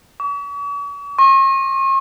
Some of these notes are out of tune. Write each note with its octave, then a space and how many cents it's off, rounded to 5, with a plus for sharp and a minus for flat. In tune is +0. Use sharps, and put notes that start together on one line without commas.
C#6 +45
C#6 -45